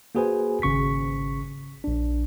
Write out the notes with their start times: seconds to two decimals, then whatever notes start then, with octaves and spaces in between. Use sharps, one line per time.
0.15 A#3 F#4 G#4 B4 C5 G#5
0.62 G#1 C#3 C#6 B6
1.84 A#1 D4